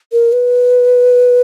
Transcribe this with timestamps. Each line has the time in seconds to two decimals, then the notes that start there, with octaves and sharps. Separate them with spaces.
0.12 A#4
0.32 B4